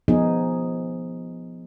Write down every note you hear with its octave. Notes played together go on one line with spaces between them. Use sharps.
F3 B3 D#4 G#4